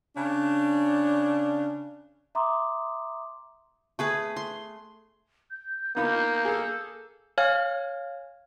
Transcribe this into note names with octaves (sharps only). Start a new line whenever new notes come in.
C#3 D4
E5 A#5 C6 D6 D#6
A3 G#4 B4
C6
G6
A#3 B3 D#4 F4
G#4 A4
C#5 F5 G#5 F6 G#6